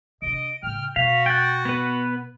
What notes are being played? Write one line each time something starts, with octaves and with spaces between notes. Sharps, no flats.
C3 D4 D#5 D7
A2 C#3 G5 F6
B2 F#4 F5 B6
G5 F#6 A6
B3 B4 B5